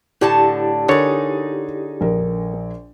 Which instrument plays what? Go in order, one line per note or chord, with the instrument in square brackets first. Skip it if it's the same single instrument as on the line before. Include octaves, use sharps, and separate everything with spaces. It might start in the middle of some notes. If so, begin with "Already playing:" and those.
[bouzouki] A2 D3 A5 [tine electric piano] E4 G4 D5
[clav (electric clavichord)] D3 C#5 [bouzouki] D#4 G#4 [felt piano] A#4 A6
[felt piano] A#1 A#4